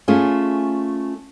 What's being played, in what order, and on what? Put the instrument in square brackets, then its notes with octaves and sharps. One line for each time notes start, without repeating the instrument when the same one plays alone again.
[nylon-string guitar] A3 C#4 F4 G#4